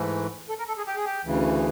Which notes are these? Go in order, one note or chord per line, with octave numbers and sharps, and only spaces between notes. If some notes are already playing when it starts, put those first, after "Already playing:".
Already playing: G#2 E3 A3
A4
A#4
A4
G#4
G4
G#4
G4
D2 C#3 E3